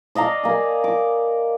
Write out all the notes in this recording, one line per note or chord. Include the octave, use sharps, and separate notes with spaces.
D5 D#5 F5 A#5
A#3 G#5
D6